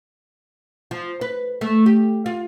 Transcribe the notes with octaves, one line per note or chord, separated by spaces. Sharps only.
F3
B4
A3
G4
F4